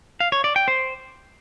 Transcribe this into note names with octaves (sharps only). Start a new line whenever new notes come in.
F5
C#5
D5
G5
C5